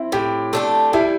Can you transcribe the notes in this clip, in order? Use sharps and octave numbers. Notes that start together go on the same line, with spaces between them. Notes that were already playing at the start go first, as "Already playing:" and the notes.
Already playing: C4 E4
A2 G4
A3 D4 A4
G3 E4